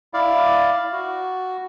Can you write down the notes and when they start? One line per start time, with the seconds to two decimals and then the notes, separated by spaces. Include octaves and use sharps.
0.14 E4 D5 F5
0.92 F#4